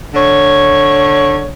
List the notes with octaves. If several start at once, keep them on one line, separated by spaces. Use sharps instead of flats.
D3 C#5